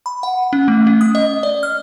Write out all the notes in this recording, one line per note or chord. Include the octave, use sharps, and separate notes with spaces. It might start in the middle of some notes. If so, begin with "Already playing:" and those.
B5
F#5
C#4
A3
C#4
D#6
D#5
D5
F6